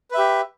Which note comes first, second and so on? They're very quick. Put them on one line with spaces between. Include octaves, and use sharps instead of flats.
B4 E5 G4